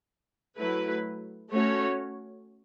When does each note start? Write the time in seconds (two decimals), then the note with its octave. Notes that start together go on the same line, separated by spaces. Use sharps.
0.58 F#3 A3 E4 B4
1.50 A3 C#4 F#4 C#5